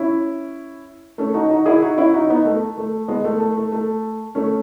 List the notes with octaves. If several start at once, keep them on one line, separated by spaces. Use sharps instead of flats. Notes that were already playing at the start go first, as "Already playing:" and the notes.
Already playing: C#4 E4
A3 C#4
D#4 F#4
D#4 F#4
E4 G#4
D#4 F#4
C#4 E4
D#4 F#4
B3 D#4
A3
A3
G#3 B3
A3
A3
A3
A3
A3 C#4